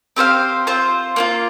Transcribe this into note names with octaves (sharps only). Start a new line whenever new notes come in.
C4 G4 C5 F5
C4 F4 C5
A#3 D4 F4